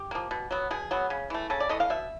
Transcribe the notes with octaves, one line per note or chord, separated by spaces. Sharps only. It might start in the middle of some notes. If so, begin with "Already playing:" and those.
Already playing: G4
F3 A#3
B2
F#3 B3
B2 G#4
F#3 B3
C#3
E3 A3
C#3 A4
D5
E3 A3 D#5
F5
B2 E5